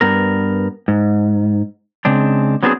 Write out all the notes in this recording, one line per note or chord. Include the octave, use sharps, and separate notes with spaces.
G2 B3 A#4
G#2
C#3 G#3 C4 D4
F#3 B3 C4 D4 G4 G#4